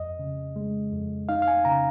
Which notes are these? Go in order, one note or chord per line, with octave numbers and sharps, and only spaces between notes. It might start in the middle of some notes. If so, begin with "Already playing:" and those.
Already playing: F2 D#5
C#3
G#3
F2
D#4 F5
F5
G#5
C#3 A#5